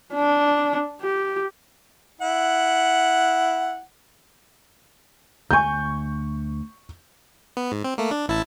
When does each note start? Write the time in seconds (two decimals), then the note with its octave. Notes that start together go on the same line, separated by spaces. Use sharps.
0.14 D4
1.01 G4
2.21 E4 F#5
5.51 D2 G#5 C#6 G6
7.57 B3
7.72 G#2
7.84 C4
7.98 A3 A#3
8.11 D4
8.28 A1 E4 A5